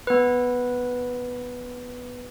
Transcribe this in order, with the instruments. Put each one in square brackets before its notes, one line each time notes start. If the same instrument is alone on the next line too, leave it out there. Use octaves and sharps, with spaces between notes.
[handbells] B3 B4